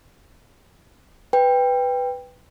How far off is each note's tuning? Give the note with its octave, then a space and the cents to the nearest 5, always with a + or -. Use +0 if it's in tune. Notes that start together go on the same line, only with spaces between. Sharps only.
B4 +5 G5 +15